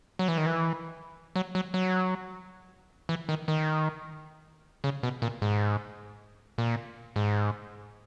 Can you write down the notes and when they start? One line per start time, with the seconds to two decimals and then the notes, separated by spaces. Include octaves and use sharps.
0.19 F#3
0.28 E3
0.38 D#3
0.46 E3
1.36 F#3
1.55 F#3
1.74 F#3
3.09 E3
3.29 D#3
3.48 D#3
4.84 C#3
5.03 B2
5.22 A#2
5.42 G#2
6.58 A#2
7.16 G#2